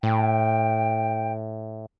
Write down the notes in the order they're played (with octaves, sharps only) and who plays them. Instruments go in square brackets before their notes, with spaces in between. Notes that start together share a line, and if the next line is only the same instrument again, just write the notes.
[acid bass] A2 [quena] G5